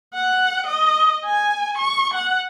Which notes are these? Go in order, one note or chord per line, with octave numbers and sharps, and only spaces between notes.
F#5
D#5
G#5
C#6
F#5